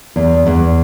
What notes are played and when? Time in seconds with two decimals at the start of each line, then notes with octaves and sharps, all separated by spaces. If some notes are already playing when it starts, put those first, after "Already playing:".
0.16 E2
0.46 E2